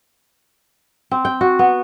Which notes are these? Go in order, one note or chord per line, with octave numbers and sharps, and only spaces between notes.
C4
G5
F#4
B3